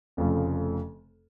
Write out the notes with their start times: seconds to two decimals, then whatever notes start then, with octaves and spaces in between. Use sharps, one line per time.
0.17 F1 F2 C#3 F3 A3